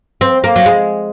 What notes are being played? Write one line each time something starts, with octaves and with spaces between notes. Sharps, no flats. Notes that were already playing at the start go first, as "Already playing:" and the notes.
C4
A#3
F#3
G#3